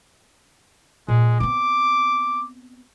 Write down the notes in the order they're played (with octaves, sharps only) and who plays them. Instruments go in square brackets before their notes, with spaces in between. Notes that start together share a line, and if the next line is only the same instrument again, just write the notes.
[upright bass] A#2 [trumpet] G#3
[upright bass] B3 C4 [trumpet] D6